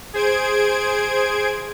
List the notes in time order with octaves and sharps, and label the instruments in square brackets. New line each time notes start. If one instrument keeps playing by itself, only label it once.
[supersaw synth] G#4 C5 G#6 D7